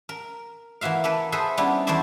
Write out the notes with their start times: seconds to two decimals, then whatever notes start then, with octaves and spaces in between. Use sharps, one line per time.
0.09 A#4
0.81 E3 A#3 F#4 E5 F5
1.04 A#3 A4 B4
1.32 G#4 A4 B4 C5 E5
1.57 G3 B3 C#4 D4 E4
1.87 E2 A3 E4 C5 D5 E5